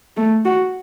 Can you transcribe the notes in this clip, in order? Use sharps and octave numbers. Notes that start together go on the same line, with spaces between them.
A3
F#4